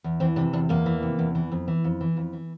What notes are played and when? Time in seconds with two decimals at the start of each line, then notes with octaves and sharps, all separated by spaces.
0.04 E2
0.20 E3 C4
0.36 C3 D4
0.53 E2 D4
0.69 E2 A#3
0.86 E3
1.02 C3
1.19 E2
1.35 E3
1.52 F2
1.68 E3
1.84 F2
2.01 E3
2.17 F2
2.33 E3